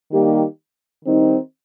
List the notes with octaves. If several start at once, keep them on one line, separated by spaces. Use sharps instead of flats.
D#3 G3 A#3 D#4 G4
D#3 G3 C4 D#4